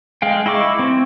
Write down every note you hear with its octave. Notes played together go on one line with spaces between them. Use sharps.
G#3 F5 G5
E4 D#5 C#6 D6
C4 C5